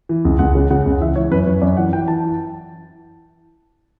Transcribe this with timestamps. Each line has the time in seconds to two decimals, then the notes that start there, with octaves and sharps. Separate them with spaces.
0.09 E3
0.25 C#2
0.39 C#2 F#5
0.55 C#3
0.71 C#3 F#5
0.86 C#2
1.00 E3 E5
1.16 E3 C#5
1.31 F#2 B4
1.46 F#2 C#5
1.62 F#2 D5
1.77 E3 F#5
1.93 E3 G5
2.08 E3 A5